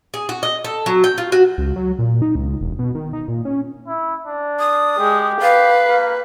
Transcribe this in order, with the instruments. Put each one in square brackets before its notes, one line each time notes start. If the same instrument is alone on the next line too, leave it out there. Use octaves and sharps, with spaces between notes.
[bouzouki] G#4
F#4
D#5
A4
F#3
G5
F4
F#4
[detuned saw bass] C#2
F#3
A#2
D#4
C#2
E1
B2
D#3
D#4
A#2
C#4
[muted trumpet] E4
D4
[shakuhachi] D#6
[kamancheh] G#3 [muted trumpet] G4
[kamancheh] B4 [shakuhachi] F5
[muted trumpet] A#3